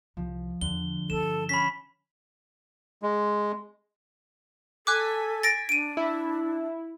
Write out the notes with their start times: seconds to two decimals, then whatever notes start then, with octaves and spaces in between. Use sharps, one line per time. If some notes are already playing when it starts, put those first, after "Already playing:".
0.17 C2 F3
0.61 E2 D3 G7
1.10 G2 E3 A4 E7
1.49 C#4 B5 B6
3.02 G#3
4.87 A4 G#5 D6 F#6 B6
5.43 A6 A#6 D7
5.69 D4 D7 D#7
5.97 E4